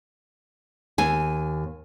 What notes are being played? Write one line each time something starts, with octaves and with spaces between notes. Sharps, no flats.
D#2 G#5